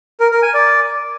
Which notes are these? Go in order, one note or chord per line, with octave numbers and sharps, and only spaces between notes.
A#4
A#4
G#5
D5